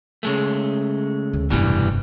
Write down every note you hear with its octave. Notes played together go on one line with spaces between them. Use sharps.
C#3 G#3 A3
D2
F1 G2 B2 E3 G3